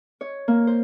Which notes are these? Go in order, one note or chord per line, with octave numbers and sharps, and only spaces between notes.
C#5
A#3
C5